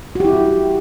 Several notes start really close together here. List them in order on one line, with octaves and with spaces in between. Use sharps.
F#4 G4 E4